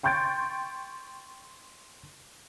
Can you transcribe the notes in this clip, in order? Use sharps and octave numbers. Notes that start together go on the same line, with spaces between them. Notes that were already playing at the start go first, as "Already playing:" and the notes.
G5 C6 C#6 G6 A6 D7